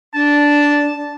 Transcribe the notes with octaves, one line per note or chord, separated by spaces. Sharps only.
D4 A5